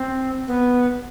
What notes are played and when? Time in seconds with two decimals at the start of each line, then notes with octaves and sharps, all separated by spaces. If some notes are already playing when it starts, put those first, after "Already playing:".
Already playing: C4
0.47 B3